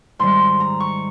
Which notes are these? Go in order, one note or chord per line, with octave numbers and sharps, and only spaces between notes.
G#2 D#3 G3 C6
A#5
C#6